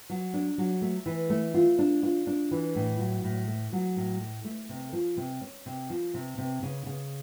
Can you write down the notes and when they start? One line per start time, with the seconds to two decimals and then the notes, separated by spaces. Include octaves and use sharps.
0.10 F#3
0.34 D4
0.58 F#3
0.82 A3
1.06 E3
1.30 A3
1.54 F4
1.79 D4
2.03 F4
2.27 D4
2.51 E3
2.75 A2
2.99 F#3
3.24 A2
3.48 A3
3.72 F#3
3.96 A2
4.20 A3
4.44 A3
4.69 C3
4.93 F3
5.17 C3
5.41 C#4
5.66 C3
5.90 F3
6.14 C3
6.38 C3
6.63 C#3
6.86 C#3